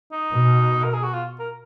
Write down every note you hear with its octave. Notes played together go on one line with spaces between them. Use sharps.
D#4
B2
A#4
G#4
F#4
F4
A#4